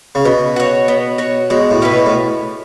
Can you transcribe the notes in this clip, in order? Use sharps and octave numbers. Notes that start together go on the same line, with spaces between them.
C#3
B2 B3
F#4 C#5
B3
F#4 C#5
B2 G#3
A2
C#4 E4 B4
B2
A2